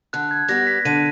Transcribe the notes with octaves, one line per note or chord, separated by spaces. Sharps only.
D3 F#6
G#6
G3 B3 A#6
B6
D3 D#7